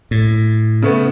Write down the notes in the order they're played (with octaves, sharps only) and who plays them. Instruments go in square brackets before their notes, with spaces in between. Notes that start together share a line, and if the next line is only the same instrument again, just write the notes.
[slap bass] A2
[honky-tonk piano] C#3 A3 B3